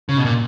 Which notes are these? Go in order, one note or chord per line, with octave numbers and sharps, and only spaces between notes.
C#3
B2
A#2